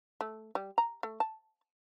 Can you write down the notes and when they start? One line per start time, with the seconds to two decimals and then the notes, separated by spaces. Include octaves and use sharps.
0.21 A3
0.55 G3
0.78 A#5
1.03 A3
1.20 A5